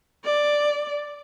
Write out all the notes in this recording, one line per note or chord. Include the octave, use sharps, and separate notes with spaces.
D5